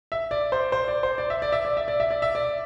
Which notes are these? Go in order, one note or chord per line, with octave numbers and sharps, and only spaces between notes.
E5
D5
C5
C5
D5
C5
D5
E5
D5
E5
D5
E5
D5
E5
D5
E5
D5